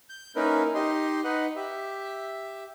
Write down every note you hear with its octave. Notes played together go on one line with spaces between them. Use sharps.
G6
A#3 C#4 D#4 E4 A#4 B4
D#4 G4 D#5 C6
D#4 B4 D#5 F#5
G4 E5